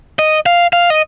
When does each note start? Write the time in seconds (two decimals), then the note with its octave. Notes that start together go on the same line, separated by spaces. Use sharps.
0.19 D#5
0.46 F5
0.73 F5
0.90 D#5